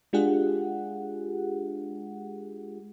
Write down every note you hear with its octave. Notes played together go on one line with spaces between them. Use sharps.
G#3 D4 F4 G4 G#4 F#5